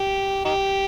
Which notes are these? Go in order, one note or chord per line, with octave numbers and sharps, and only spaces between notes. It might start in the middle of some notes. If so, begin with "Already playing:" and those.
Already playing: G4
D#4 G4